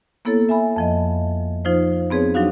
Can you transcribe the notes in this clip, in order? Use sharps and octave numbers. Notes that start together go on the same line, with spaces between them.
A#3 B3 E4 A4 C#5 A6
E5 G#5 B5
F2 F3 D#5
F3 D#4 F4 C5
B3 C4 G#4 B4 C#5
F#3 D4 D#4 F#4 F5